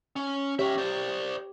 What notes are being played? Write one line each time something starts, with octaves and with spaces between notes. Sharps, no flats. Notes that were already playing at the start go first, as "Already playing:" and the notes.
C#4
C#4 G4 C#5 E5
C5 D5